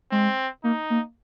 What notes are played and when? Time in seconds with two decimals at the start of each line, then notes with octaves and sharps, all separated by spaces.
0.11 G#3 C4
0.64 A#3 D#4
0.90 A#3